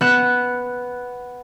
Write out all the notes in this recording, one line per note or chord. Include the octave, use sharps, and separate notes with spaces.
B3 F#6 E7